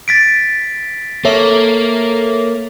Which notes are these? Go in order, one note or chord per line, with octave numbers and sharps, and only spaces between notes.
A6 B6 D7
A#3 A4 C#5 E5